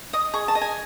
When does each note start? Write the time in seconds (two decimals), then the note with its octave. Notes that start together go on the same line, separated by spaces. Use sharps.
0.13 D#5 D#6
0.34 G#4 C#6
0.48 A5
0.55 D#5
0.61 G#5